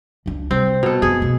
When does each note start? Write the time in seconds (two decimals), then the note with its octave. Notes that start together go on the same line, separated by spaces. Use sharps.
0.26 C#2 D4
0.51 C3 G3 C4
0.83 B2 A4
1.02 F2 F4 G#4
1.22 B2